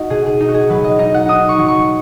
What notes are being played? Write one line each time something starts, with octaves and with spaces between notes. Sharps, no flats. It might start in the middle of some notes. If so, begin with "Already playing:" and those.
Already playing: D#4 F#4
B2 G#4
G#4
D#4
F#4
G#4
F#3 B4
D#5
D#4 D#5
F#5
D#4 D#6
C#6
F#3
C#6